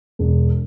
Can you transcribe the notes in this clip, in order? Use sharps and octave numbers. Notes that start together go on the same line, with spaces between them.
E1